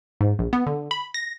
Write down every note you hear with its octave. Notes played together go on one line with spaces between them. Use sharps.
G#2
A#1
B3
D3
B5
A#6